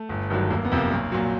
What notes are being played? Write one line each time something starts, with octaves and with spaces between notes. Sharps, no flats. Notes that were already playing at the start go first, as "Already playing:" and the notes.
Already playing: A3
G1
G2 D#3 F#3
F1 A#3
B3
F2 C3
A#3
B1 A#3
A#2 F#3